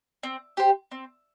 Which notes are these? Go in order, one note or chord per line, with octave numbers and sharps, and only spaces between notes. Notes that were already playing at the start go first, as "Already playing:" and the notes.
C4
G4 C5
C4